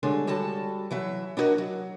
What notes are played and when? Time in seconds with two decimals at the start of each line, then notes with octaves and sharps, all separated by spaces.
0.03 D3 G3 G#3 D4 A4 C#5
0.27 G3 F#4 A4 A5
0.91 E3 F#3 E5
1.37 D4 E4 F#4 A#4 D#5
1.58 F#3